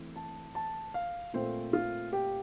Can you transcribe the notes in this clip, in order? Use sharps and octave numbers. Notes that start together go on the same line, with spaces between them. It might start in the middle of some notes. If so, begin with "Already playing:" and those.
Already playing: E3 A3 C4
A5
A5
F5
A#2 A3 C4 C5
F4
G4